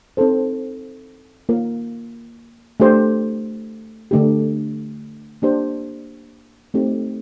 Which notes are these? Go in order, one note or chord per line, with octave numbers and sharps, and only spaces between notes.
C4 D#4 A4 C5
A#3 F4 A#4
A3 D4 G4 C5
D3 A3 D4 G4
A#3 D4 G4 C5
A3 C4 D#4 G4